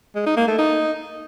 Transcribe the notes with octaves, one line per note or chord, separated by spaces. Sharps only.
G#3
D#4
A#3
A3
D#4